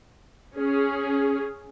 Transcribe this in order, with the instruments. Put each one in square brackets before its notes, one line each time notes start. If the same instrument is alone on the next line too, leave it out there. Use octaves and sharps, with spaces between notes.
[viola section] C#4 G#4